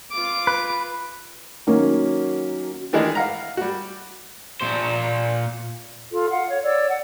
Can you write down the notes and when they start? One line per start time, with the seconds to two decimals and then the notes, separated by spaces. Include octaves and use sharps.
0.12 F4 D6
0.47 B4
1.67 D#3 F#3 A#3 C#4
2.93 D#3 E3 G#3 D4 D#4 G#4
3.15 F5 F#5 A#5
3.57 G3 F#4
4.61 A#2 C5
6.12 F4 A4
6.29 F5 F#5
6.50 C#5
6.64 C#5 D5 E6
6.89 F#5